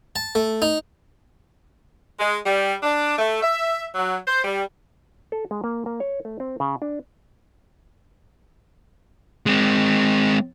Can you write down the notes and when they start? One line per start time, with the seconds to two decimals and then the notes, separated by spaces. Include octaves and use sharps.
0.16 A5
0.35 A3
0.62 D#4
2.19 G#3
2.44 G3
2.83 D4
3.18 A3
3.42 E5
3.95 F#3
4.27 C5
4.45 G3
5.32 A4
5.51 G#3
5.64 A#3
5.86 A#3
6.00 C#5
6.25 A3
6.40 C4
6.60 C#3
6.82 D4
9.46 G#3 C4